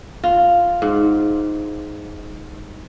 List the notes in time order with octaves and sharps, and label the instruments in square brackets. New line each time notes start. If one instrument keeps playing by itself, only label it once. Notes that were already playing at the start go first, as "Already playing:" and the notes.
[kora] F4
G#2